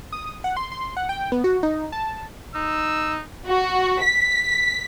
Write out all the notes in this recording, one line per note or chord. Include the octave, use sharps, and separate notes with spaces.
D#6
F#5
C6
C6
F#5
G5
B3
F#4
D#4
A5
D#4 E6
F#4
B6